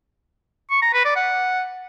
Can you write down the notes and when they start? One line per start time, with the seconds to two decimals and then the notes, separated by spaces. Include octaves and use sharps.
0.71 C#6
0.82 A#5
0.93 B4
1.05 D5
1.16 F#5